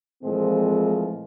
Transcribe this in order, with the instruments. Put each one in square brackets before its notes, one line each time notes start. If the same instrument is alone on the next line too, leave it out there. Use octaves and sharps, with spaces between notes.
[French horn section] A#2 E3 F3 G#3 A3 C4